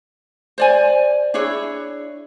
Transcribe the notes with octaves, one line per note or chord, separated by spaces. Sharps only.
C5 D5 G#5
D4 E4 G#4 C#5